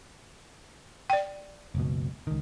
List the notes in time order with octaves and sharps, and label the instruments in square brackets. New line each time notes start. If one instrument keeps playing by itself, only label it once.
[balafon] D5 G5
[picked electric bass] F#1 C#2 B2
C#2 D#3